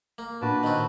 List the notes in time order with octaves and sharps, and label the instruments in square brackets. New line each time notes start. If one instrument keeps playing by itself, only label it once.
[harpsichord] A#3
[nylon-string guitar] A#2 D4 [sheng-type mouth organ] F#4 B4 A5
[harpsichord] D#3 C4